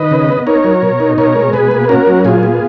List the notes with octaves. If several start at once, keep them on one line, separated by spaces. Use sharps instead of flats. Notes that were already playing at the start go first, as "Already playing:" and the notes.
Already playing: D#3 B4 D#5
C#3
B3
D#4 A#4 C#5
F#3
B2
D#4
B2 A#4 C#5
G#3
B2 G#4 B4
A#3
C#4 F#4 A#4
F#3
A#2 F4 G#4
B3